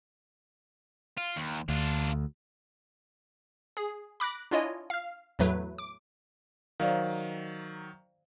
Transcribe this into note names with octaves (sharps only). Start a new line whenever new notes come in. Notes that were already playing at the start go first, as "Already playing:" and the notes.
F4
D#2
D2 D4 F4
G#4
B5 D6 F#6 A#6
D4 E4 F4 C#5 D#5 G#5
F5 F6
E2 A2 F#3 A3 B4
D6
D#3 F#3 C5 D5 F5